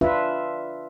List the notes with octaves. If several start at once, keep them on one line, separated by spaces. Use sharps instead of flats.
D4 F4 B4 E5